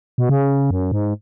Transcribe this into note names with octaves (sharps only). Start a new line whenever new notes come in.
B2
C#3
F#2
G#2